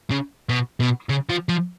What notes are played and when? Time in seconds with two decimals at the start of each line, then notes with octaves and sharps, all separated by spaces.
0.11 C#3
0.49 B2
0.80 B2
1.09 C#3
1.30 F3
1.49 F3